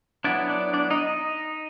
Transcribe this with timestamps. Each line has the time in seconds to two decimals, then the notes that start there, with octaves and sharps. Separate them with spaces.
0.24 F#3 B3 D4 E4 D5
0.49 D4 D5
0.74 D4 D5
0.90 D#4 D#5
1.06 D#4 D#5